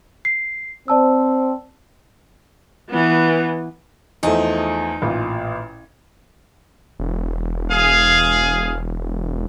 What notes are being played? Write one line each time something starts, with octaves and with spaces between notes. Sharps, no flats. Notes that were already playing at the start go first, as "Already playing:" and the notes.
C7
C4 C5 D5 A5 E6
E3 B3
E2 F3 A3 D#4
A1 A#2 F4
E1
G#4 F5